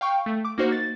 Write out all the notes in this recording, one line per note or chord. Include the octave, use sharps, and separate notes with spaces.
F5 G5 C#6
A3
D6
A#3 D#4 F#4 C5
A6